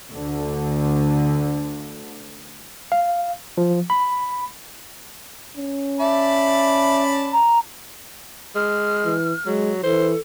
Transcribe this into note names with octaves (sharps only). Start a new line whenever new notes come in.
D2 D3
F5
F3
B5
C#4
D5 E5 A5 B5
A#5
G#3 F6
E3
F#3 G#3
E3 A4 C5